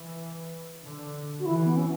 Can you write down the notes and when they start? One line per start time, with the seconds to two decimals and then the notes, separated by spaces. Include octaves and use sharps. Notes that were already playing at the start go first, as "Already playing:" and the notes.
Already playing: E3
0.84 D3
1.40 F#4
1.45 E3 E4
1.65 B3
1.77 C#4